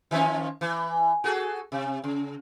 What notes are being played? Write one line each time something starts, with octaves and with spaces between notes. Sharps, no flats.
D#3 F3 C#4
E3
F#4 G#4 A4
C3
C#3